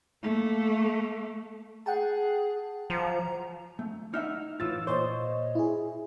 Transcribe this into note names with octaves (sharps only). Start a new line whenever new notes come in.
A3 A#3
G#4 F#5 G5 A5
F3 A#5
A3
D#4 E5 F#5 F6
A2 E3 F4 E6 A6
A#2 C5 C#5 D#5
E4 G#4